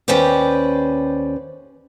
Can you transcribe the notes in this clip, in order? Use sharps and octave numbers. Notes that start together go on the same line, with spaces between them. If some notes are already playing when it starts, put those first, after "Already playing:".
D#2 C#4 G4 B4 C5 D5